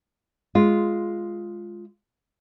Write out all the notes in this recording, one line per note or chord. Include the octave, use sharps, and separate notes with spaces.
G#3 F4